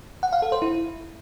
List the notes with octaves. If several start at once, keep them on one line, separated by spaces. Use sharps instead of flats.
F#5
F5
A4
C5
E4